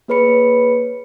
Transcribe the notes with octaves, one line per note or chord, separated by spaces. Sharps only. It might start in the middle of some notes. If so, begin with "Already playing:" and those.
A#3 G#4 B4 C#5 B5 C#7